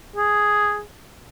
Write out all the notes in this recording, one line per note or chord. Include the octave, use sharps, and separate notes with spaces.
G#4